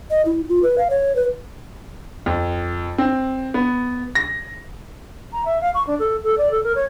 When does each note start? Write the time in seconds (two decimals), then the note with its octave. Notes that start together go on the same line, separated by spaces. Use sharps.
0.10 D#5
0.25 E4
0.49 F4
0.63 B4
0.78 F5
0.90 C#5
1.16 B4
2.26 F2
2.98 C4
3.54 B3
4.15 A#6
5.33 A#5
5.45 E5
5.61 F5
5.74 C#6
5.87 D4
5.99 A4
6.23 A4
6.37 D5
6.51 A4
6.63 A#4
6.75 C#5